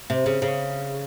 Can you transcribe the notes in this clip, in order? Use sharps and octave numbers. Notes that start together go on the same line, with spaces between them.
C3
C#3
C#3